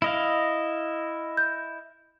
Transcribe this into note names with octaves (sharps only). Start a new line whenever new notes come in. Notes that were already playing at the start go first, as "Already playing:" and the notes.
E4 D#5 F5
G6